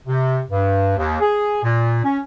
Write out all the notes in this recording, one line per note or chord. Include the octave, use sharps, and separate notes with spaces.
C3
G2
D#2
G#4
A#2
C#4